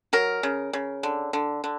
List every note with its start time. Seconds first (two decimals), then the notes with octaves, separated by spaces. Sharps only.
0.13 F#3 A#4
0.43 C#3
0.73 C#3
1.03 D3
1.33 D3
1.64 D3